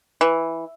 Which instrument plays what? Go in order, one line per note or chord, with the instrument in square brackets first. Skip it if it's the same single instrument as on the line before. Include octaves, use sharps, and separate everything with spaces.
[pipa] E3